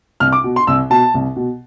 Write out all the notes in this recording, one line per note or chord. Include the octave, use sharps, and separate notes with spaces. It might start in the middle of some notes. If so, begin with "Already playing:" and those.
C2 F6
D6
B2
C6
C2 E6
B2 A5
C2
B2